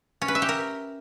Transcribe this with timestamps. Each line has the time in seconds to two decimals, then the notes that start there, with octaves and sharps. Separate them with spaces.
0.22 C#4
0.28 B4
0.35 E5
0.42 G4
0.49 A#4